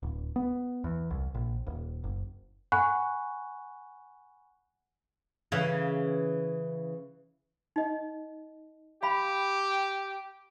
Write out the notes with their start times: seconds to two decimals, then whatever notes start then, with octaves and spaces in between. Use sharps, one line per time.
0.03 D1
0.36 B3
0.84 E2
1.10 C2
1.34 A#1
1.67 D#1
2.04 F#1
2.72 F#5 G#5 B5 C#6 F#6
5.52 C#3 E3
7.76 D#4 D#5
9.03 G4 F5 B5